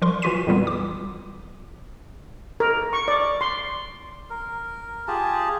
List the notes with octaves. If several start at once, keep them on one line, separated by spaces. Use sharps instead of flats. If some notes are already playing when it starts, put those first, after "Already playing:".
F3 G3 A#4 C6 C#6
E3 F4 F#4 C6 B6 D#7
F2 A#2 E3 G3 B3
D6
A#4
C#6
D5
C6
A#4
F4 G4 G#4 A5